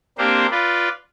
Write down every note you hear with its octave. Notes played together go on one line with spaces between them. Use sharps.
A#3 C4 D4 G4 A#4 C5
F4 B4 D5